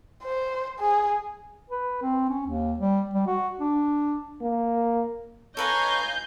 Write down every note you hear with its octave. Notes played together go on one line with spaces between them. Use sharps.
C5
G#4
B4
C4
C#4
D#2
G3
G3
F#4
D4
A#3
A4 B4 C#5 D#5 F5 G#5 A#5 G6